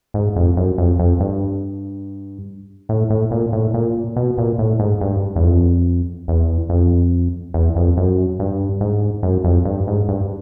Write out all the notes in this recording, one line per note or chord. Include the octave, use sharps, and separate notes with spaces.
G#2
F2
F#2
F2
F2
G2
A2
A2
A#2
A2
A#2
B2
A#2
A2
G#2
G2
E2
F2
E2
F2
E2
F2
F#2
G2
G#2
F#2
F2
G2
G#2
G2